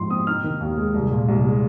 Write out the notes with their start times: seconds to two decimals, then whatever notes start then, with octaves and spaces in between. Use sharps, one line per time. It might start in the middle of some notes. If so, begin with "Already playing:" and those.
Already playing: G#2 F3 C6
0.10 C4 D#6
0.27 D#4 F6
0.44 D#3
0.60 D#2
0.77 G#3
0.94 C2
1.11 A#2
1.28 C2
1.44 G#3